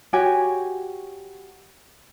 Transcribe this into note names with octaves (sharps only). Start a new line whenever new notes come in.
F#4 G4 C#5 G#5